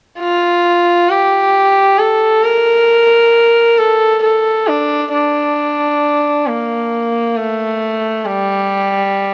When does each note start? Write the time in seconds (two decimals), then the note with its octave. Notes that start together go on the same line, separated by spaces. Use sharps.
0.20 F4
1.09 G4
1.98 A4
2.44 A#4
3.78 A4
4.23 A4
4.68 D4
5.12 D4
6.47 A#3
7.36 A3
8.25 G3